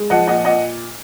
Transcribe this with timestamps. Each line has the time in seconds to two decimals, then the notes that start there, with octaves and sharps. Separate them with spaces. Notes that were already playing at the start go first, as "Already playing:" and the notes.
Already playing: G#3
0.10 F3 D#5 F#5
0.27 A#2 D#5 F#5
0.45 A#2 D#5 F#5